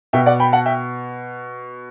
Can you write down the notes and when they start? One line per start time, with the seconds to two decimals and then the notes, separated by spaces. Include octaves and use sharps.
0.13 B2 E5 G5
0.26 D5 F#5
0.39 G5 B5
0.52 F#5 A5
0.66 E5 G5